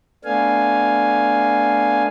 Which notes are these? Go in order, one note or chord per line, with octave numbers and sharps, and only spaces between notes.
A3 B3 D4 F5 G#5